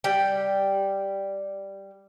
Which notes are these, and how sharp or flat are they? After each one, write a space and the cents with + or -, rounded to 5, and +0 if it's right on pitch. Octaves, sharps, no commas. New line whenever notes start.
G3 +0 G5 +0